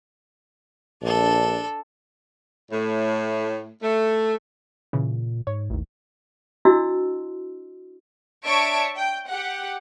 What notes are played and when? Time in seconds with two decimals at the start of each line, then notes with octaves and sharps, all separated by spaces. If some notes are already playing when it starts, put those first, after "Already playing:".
1.02 A#1 D4 A4
2.70 A2
3.80 A3
4.93 A#2 C#3 E3
5.47 G#2 C#5
5.70 A1 D#2
6.65 D4 E4 F#4 D#5 C6 E6
8.45 D4 C#5 E5 A5 C#6 D7
8.96 G5
9.28 G4 F#5